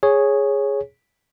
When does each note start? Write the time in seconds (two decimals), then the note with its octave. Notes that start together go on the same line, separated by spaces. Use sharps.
0.03 G#4 C#5